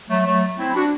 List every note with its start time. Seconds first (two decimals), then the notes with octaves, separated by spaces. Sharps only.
0.09 F#3 A3
0.25 F#3 A3
0.58 C4 E4
0.74 D4 F#4